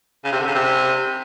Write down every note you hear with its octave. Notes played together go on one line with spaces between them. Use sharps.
C#3
C3
D3
C#3
C3